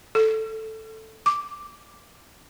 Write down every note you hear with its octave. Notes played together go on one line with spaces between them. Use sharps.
A4
D6